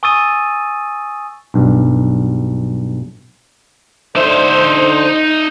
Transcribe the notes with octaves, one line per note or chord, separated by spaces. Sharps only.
G#5 C#6 D#6 E6 A6 D#7
B1 G2
D3 D#4 C5 E5